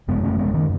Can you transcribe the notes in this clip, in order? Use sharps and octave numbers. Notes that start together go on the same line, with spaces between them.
F#2 C#3 G#3 B3
A3 C#4
G#3 B3
D#3